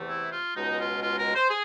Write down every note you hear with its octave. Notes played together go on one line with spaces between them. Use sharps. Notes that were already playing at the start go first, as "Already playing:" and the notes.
Already playing: E2 C3 E3 A3
E4
F4
C#2 B2 G#3 D#4
F4
F4
A#4
C5
G#4